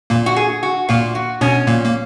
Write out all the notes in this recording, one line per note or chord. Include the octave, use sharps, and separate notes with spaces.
A#2 A#3
F#4
G#4
F#4
A#2 A#3 F4
F#4
B2 B3 C#4
A#2 A#3
A#3